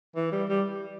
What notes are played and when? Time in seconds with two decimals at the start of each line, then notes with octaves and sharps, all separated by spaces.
0.16 E3
0.32 G3
0.49 G3